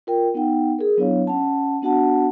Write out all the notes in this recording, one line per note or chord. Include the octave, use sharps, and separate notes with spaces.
F4 A#4 G5
B3 D#4 F#5 G5
G#4 A#4
F#3 B3 D4 E4 C#5 F5
C#4 F#5 A5
B3 D4 F#4 F#5 A5